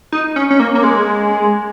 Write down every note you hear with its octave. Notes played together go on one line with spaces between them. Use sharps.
D#4
C#4
C#4
A#3
A#3
G#3